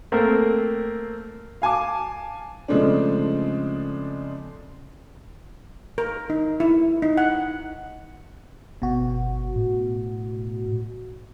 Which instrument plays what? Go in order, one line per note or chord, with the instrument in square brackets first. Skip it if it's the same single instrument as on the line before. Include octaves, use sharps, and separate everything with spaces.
[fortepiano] A3 A#3 C4 A#4
[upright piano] F5 G#5 A5 D6
C#3 F3 G#3 A3 C4 D4
[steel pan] A#4
D#4
E4
D#4
F#5
[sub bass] G1 [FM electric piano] B2 F#4
[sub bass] A2